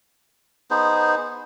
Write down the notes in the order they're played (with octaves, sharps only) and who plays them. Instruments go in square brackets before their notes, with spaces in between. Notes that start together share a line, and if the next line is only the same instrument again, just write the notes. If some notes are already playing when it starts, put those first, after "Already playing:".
[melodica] B3 D#4 G#4 C5